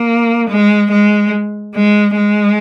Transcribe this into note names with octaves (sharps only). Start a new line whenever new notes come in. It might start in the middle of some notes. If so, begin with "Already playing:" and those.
Already playing: A#3
G#3
G#3
G#3
G#3